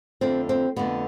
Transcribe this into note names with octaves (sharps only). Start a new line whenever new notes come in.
F2 D3 A3 C4
C4
F2 D3 A3 B3